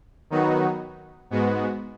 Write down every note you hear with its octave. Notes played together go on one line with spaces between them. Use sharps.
D#3 F#3 B3 D#4 F#4
G#2 G#3 B3 F#4